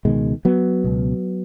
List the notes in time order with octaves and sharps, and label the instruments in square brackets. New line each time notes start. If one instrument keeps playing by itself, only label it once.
[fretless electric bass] C#2 B2 D#3 G#3
F#3 B3
C#2 B2